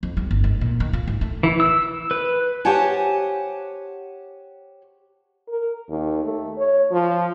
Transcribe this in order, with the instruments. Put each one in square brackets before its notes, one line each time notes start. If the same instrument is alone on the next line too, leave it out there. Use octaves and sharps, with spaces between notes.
[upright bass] F2
G3
G1
G#2
A#2
D#3
F4
G#2
A3
[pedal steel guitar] E3
E6
B4
[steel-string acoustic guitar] G4 C5 C#5 F#5 G#5 A5
[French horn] A#4
D#2
A3
C#5
F3